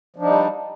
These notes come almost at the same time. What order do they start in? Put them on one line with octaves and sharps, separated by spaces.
F3 D4 D#4 G3